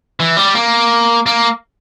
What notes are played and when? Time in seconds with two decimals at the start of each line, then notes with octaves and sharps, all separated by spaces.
0.20 E3
0.37 G3
0.55 A#3
1.26 A#3